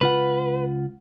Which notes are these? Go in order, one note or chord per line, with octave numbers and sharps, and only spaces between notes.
C#2 F4 B4 F#5